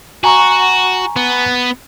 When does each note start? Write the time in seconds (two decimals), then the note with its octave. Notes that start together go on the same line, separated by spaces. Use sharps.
0.24 F#4 G#5 A#5 C#6
1.16 B3